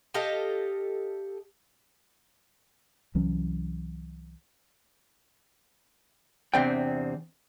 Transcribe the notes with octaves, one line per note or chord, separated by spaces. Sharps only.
G4 A4 D#5 F5
C2 E3 F#3 C#4
E2 C3 C4 D4 G5